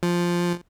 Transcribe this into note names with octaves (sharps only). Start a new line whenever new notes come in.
F3